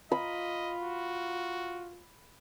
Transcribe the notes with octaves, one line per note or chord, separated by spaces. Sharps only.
F4 D#5 B5
F#4